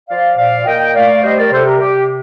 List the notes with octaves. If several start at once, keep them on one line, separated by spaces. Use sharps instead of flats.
F3 D5 F5
A#2 D5 F5
A#2 D#5 G5
A3 D5 F5
G3 C5 D#5
A#4 D5
C3 A4 C5
G4 A#4
C3 G4